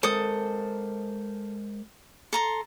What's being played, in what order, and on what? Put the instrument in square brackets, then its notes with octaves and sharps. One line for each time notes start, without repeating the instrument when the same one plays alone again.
[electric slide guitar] G#3 A#4 C5 [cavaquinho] A4 D#6
[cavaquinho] A4 A#5 C6